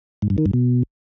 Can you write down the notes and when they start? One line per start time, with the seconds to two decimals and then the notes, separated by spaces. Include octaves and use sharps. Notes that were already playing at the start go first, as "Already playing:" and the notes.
0.22 G#2
0.30 G2
0.38 D#3
0.46 G2
0.53 B2